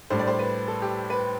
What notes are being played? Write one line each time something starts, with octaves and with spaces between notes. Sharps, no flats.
A2 G3 D4 C5
D5
C5
B4
A4
G4
B4